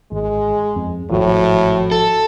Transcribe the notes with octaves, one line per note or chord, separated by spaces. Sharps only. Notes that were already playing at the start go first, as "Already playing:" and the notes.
G#1 G#3
F2
G#1 A2 F3 F#4
A4